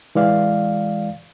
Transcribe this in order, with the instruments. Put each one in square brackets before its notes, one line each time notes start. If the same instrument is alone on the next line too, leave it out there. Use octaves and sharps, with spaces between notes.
[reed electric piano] E3 G#3 D5 F5